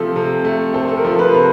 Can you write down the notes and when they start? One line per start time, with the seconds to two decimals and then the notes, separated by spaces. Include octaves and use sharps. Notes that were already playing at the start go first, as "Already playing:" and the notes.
Already playing: C3 F3 A3 C4 A4
0.16 C3
0.45 A3
0.74 C4 A4
0.97 A#4
1.05 F3
1.19 B4
1.34 C3